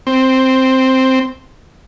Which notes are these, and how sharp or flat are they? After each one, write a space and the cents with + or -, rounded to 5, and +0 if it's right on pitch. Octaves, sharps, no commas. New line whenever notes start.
C4 +0